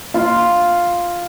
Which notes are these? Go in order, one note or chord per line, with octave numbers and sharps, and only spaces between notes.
F4